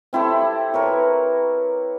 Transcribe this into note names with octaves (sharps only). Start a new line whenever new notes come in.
C4 E4 G4 A4
A#4 B4 C#5